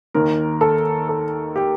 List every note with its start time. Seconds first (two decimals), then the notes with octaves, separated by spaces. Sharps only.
0.14 D#2 D#3 A#4
0.61 A4
1.09 A4
1.56 G4